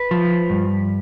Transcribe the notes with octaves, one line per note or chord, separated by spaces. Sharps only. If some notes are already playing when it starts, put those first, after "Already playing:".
Already playing: B4
F3
G2